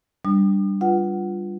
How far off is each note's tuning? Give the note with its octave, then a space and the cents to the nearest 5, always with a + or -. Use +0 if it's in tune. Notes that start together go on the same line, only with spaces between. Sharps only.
G3 +0 D4 +0 D#6 -45
F4 +0 B4 +0 F#5 +15